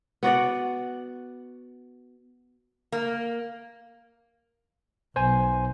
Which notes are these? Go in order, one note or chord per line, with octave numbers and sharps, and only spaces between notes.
B3 F#4 D5 F#5
A#3
B1 C5 G#5